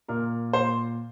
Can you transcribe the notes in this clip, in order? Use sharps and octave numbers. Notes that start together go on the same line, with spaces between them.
A#2 A#4
A#2 C5